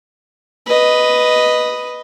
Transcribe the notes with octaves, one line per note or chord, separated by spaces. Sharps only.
B4 D#5